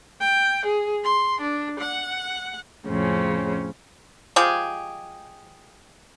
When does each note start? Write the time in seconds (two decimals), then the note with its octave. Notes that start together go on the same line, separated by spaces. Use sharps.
0.20 G5
0.66 G#4
1.04 C6
1.41 D4
1.80 F#5
2.86 F2 A2 C#3 C4 C#4
4.36 F3 G#3 G4 G#4